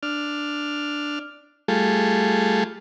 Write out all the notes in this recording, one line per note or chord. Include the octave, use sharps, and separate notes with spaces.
D4 F6
G3 A3 F4 G#4 A4